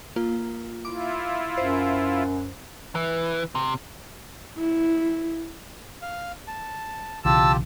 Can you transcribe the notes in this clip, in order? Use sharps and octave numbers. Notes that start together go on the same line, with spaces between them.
A#3 F4
E4 F4 D6
F#2 C5
E3
C3
E4
F5
A5
B1 C#3 E3 F4 G4 A5 E6